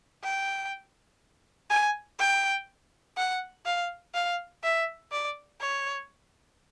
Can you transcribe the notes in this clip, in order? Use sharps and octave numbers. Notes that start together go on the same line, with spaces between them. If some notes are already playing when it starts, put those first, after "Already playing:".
G5
G#5
G5
F#5
F5
F5
E5
D5
C#5